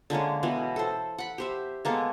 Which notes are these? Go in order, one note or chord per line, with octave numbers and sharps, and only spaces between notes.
D3 G#3 A#3 C#4
B2 E3 B3
A4 C5
F#5 B5
G4 C5 E5
G#3 A#3 B3 A4